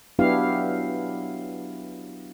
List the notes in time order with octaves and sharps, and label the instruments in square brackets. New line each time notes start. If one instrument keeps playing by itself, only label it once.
[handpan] F#3 B3 D4 E4 G4 F5